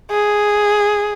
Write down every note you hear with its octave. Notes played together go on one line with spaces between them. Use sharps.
G#4